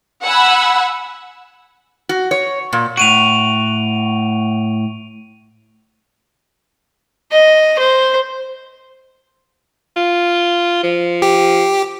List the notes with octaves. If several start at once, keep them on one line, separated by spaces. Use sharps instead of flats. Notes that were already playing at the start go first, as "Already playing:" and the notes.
F#5 G#5 B5 E6
F#4
C#5
A#2
A2 F#4 D7 D#7 F7
D#5
C5
F4
F3
G4